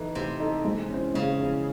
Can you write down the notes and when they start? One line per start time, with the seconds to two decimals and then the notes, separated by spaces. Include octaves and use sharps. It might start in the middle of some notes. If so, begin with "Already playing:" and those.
Already playing: E3 D#4 A4
0.15 C3 A3
0.40 D#4 A4
0.65 G#3
0.89 C#4 E4 C5
1.14 C#3 G#3
1.40 C#4 E4 C5